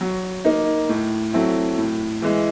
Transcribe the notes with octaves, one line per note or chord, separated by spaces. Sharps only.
F#3
A#3 D#4
A2
F#3 A3 C4 E4
A2
E3 G#3